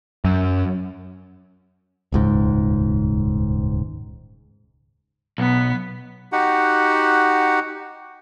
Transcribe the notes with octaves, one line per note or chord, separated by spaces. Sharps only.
F#2
D#1 C#2 G#2
B1 B3 B6
D#4 F#4 G4 F#5